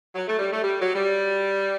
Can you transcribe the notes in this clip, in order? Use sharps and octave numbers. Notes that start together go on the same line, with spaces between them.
F#3
A3
G3
A3
G3
F#3
G3